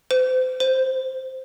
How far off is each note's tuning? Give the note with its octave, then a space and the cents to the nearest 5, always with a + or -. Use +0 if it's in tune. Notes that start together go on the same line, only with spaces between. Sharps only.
C5 -35
C5 +0